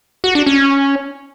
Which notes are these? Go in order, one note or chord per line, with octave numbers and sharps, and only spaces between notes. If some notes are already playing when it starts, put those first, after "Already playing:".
F#4
D4
C#4